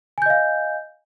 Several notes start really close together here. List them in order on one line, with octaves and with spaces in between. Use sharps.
G#5 G6 D#5 F5